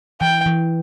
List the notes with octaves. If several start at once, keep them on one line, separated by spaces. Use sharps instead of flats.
E3 G5
E3